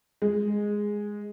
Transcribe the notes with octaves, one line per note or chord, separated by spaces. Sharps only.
G#3